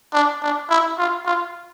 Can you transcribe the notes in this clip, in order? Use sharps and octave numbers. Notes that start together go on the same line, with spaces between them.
D4
D4
E4
F4
F4